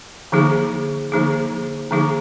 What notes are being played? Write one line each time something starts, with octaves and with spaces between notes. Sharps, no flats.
D3 F3 A#3 D#4 G#4
D3 F3 A#3 D#4 G#4
D3 F3 A#3 D#4 G#4